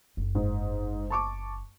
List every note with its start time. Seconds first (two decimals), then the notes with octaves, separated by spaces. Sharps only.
0.17 F#1
0.35 G#2
1.10 A5 C#6 D6